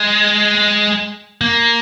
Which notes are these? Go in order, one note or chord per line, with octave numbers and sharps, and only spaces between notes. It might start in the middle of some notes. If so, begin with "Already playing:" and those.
Already playing: G#3
A#3